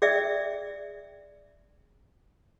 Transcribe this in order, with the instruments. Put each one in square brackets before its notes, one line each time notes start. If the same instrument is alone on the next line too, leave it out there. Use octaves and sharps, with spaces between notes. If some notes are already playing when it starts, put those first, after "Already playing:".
[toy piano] G#4 D5 E5 G5 E6